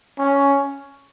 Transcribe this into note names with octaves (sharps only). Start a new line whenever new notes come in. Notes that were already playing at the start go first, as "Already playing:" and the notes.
C#4